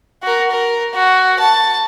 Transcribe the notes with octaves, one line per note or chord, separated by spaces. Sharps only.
F#4 A#4
A#4
F#4
A5